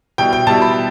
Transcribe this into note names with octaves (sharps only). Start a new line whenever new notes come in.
B2 G3 E4 G5
G5
B2 G3 E4 A5
B5